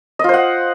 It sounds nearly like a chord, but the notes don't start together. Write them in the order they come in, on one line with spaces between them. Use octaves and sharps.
D#5 F4 C5 F#5